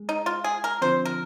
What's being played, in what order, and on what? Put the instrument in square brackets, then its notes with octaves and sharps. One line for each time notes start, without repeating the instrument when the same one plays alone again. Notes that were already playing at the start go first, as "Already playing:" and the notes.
Already playing: [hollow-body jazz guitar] G#3
[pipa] D#4
F4
G#4
A#4
[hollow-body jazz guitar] D3 F3 C4 [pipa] C5
[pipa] A#4